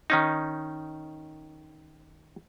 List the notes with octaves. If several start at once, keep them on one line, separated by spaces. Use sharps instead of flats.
D#3 C#4 D#4